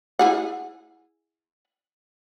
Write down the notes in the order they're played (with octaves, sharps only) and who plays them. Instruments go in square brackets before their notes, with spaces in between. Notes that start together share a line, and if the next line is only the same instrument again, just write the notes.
[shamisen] E4 G#4 F#5